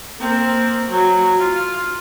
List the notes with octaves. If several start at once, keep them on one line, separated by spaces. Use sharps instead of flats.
A#3 C4
F#3
F4